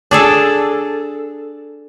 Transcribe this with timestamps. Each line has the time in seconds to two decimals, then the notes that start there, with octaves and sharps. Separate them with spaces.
0.11 D4 G#4 A4